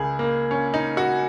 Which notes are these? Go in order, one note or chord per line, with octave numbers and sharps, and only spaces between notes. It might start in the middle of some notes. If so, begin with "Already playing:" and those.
Already playing: C#2 C#3 G#4 A#4
A#3
C#4
D#4
F#4